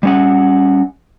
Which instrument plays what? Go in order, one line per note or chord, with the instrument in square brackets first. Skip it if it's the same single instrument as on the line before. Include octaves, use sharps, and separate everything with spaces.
[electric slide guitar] G3 C#4 F#5